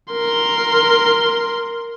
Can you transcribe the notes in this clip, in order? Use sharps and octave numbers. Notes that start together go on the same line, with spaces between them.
A#4 C6